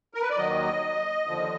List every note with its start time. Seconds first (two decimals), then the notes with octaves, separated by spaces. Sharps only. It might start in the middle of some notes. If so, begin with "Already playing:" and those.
0.14 A#4
0.22 B4
0.30 D5
0.38 D#2 D#3 F#3 D#5
1.27 D#2 D3 F3